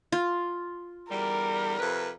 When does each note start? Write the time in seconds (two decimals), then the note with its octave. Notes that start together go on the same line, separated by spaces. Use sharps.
0.12 F4
1.10 E2 D3 G3 A#4
1.80 F2 C3 B4